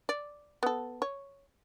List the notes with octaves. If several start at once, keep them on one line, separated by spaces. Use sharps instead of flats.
D5
B3 A4
C#5